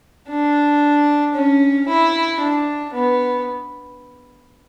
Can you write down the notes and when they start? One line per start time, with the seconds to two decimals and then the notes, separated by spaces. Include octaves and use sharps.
0.28 D4
1.34 C#4
1.88 E4
2.40 D4
2.93 B3